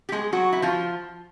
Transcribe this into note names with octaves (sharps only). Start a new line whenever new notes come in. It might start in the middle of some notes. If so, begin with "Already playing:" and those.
G4
G#3 G#4
F#3 F#4
E4
F3 F4